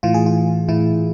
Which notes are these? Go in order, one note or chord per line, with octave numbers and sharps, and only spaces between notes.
A2 E3 F4
G#4
F4
A2 E3 E4